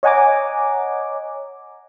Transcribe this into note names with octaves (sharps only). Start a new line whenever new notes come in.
C#5 D#5 F#5 G#5 A#5 D6